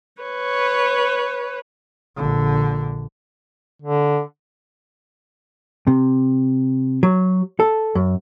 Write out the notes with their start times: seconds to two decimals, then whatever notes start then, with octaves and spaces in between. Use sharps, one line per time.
0.22 B4 C#5
2.16 A#1 D3
3.82 D3
5.87 C3
7.03 F#3
7.60 A4
7.95 F#2